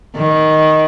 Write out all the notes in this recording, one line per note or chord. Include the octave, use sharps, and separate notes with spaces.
D#3